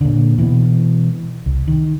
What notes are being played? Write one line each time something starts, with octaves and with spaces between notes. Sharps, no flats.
A#2 D3
B2 E3
C2
D#3